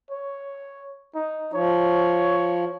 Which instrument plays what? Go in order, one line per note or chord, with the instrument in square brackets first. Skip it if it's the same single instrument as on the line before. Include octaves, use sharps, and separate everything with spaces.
[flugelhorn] C#5
D#4
[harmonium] F3 [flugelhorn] C#5